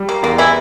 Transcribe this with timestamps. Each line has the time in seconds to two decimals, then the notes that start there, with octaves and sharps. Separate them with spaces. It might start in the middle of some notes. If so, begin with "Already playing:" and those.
Already playing: G3
0.09 A#3
0.23 E2 A#3
0.38 E3 E4